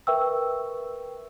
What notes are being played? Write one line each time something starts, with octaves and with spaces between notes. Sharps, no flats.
A#4 B4 E5 G5 C#6 E6